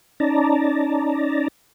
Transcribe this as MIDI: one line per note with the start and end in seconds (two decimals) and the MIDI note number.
0.20 1.48 61
0.20 1.48 63
0.20 1.48 74
0.20 1.48 81
0.20 1.48 82